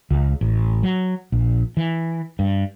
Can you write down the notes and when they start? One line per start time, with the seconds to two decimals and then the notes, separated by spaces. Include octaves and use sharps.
0.11 C#2
0.41 A1
0.83 F#3
1.32 A#1
1.77 E3
2.39 G2